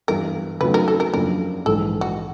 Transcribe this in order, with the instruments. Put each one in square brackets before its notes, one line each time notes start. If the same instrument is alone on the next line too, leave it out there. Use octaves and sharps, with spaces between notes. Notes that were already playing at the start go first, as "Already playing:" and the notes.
[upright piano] G2 E3 G3 B3 [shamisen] A#4
[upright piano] C#3 F#3 A3 C4 D#4 [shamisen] B4
[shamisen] A#4
A4
A#4
[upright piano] F#2 C#3 F3 A#3 D4 [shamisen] A#4
[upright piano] A#1 G#2 E3 G#3 [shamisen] A4
[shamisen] F#4